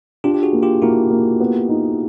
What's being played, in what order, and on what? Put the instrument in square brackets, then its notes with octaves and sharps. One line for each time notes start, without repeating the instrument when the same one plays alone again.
[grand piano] D4 [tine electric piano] F4 G4
[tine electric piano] G4
F#4 G#4
[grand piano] A#3
[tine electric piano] F4 G4
[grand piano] A#3 [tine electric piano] E4 F#4
[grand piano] A#3
B3
D#4